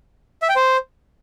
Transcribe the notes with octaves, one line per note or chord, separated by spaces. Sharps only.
E5
G5
C5